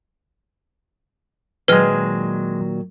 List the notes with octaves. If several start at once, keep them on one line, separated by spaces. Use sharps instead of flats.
A#2 D#3 F#3 G#3 G#4 B4 F6